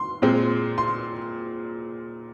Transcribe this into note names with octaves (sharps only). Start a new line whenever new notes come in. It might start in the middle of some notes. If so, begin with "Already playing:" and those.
Already playing: C6
A#2 G#3 C4
C6